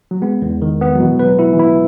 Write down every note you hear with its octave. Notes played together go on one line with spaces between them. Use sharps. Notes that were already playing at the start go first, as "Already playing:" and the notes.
F#3
G#3 B3
E2
D#3
B3
F#3
B2 E3
B4
F#3
E4
E3
E4